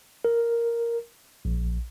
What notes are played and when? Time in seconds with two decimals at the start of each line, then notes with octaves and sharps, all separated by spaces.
0.25 A#4
1.45 A#1